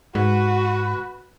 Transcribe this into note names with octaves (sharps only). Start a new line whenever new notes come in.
G#2 F#4 B4